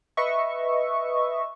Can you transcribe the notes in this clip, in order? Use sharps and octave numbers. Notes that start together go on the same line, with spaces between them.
B4 D#5 E5 C#6